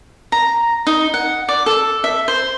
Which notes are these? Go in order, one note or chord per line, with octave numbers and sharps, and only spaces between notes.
A#5
D#4
F#5
D5
A4
E5
C5